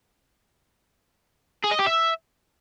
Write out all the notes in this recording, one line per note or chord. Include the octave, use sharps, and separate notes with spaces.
G#4
D#5
G4
E5